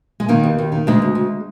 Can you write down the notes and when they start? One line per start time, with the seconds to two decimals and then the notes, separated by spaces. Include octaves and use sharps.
0.20 G#3
0.29 D#3 A#3
0.44 D#2
0.58 D#2
0.72 D#3
0.87 D2 G#3
1.02 D2
1.15 D2